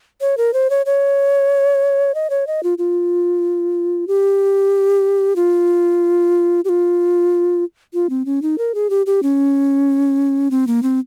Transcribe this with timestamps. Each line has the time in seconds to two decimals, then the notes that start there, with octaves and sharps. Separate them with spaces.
0.21 C#5
0.37 A#4
0.54 C5
0.70 C#5
0.86 C#5
2.15 D#5
2.30 C#5
2.47 D#5
2.63 F4
2.78 F4
4.08 G4
5.36 F4
6.65 G4
6.69 F4
7.94 F4
8.10 C4
8.26 C#4
8.42 D#4
8.58 A#4
8.75 G#4
8.90 G4
9.06 G4
9.23 C#4
10.51 C4
10.67 A#3
10.83 C4